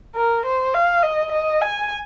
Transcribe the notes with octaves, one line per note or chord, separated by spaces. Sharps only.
A#4
C5
F5
D#5
D#5
G#5